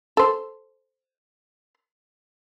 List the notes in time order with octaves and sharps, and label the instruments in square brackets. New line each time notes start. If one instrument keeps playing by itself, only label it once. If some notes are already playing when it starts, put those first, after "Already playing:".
[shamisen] A4 C5